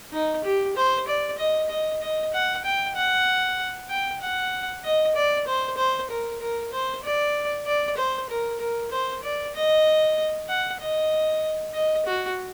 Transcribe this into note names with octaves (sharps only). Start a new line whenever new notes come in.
D#4
G4
C5
D5
D#5
D#5
D#5
F#5
G5
F#5
G5
F#5
D#5
D5
C5
C5
A#4
A#4
C5
D5
D5
C5
A#4
A#4
C5
D5
D#5
F#5
D#5
D#5
F#4